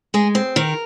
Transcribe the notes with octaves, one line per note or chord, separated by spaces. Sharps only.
G#3 G#4
C4
D#3 A#4